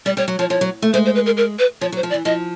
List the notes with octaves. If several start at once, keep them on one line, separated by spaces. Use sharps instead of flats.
G3 D5
G3 C#5
F#3
F3 C#5
F3 C#5
F#3
A3
G#3 C5
C5
B4
A#4
A#4
B4
F3 C#5
F#3
C5
F3
D5
E3
F3 D#5